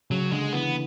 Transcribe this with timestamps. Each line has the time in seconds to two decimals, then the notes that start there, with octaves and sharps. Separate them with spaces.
0.10 C#3 F#3
0.31 D3 G#3
0.53 E3 B3